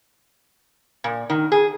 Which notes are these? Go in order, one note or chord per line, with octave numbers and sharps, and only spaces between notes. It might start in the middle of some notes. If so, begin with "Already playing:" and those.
A#2
D#3
G#4